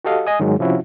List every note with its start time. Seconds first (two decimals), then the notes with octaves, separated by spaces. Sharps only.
0.04 F#4 G4 A4 D#5 F5
0.27 D#5 G#5 D#6
0.40 G#2 D#3 F#3 G#3
0.59 C3 F3 C#4 E4 F#4